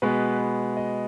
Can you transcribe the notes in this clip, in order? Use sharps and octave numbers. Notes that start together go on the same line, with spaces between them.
B2 G#3 B3 B4
D#5